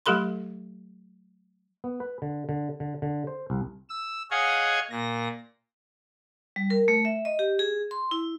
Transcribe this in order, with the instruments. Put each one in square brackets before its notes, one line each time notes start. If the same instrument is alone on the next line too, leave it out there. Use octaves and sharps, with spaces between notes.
[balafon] F#3 A3 G4 A4 B5 C6
[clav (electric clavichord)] B3
B4
D3
D3
D3
D3
C5
C2
[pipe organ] E6
G#4 C#5 D#5 F5 F#5 G#6
A#2 A#6
[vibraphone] G3
A#4
A3
E5
D#5
G4
G#4
C6
E4